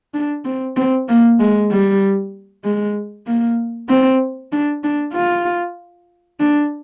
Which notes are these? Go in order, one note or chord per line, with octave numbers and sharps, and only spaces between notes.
D4
C4
C4
A#3
G#3
G3
G#3
A#3
C4
D4
D4
F4
D4